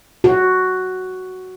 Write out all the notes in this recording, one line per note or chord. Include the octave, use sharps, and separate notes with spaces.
F#4